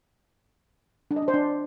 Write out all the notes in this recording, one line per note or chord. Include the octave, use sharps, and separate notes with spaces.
D4
D#5
D4
C5
D4